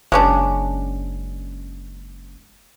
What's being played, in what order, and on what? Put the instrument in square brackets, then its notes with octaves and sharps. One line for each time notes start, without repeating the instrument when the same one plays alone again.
[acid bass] F#1 [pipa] G#3 C#4 D4